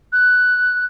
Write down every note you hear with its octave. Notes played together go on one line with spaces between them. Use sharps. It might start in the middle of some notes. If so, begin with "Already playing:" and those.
F#6